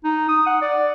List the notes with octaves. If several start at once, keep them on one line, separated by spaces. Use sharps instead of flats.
D#4
D#6
F#5
D5